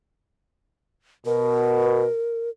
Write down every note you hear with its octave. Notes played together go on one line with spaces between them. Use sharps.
B2 A#4